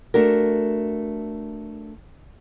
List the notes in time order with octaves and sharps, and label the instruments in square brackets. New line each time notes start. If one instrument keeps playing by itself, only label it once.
[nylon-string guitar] A3 D4 F#4 A#4